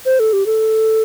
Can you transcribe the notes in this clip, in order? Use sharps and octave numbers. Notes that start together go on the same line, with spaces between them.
C5
A4
G4
A4